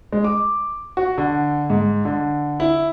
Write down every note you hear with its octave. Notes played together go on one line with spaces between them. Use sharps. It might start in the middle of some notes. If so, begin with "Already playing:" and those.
G#3
D6
F#4
D3
G#2
D3
E4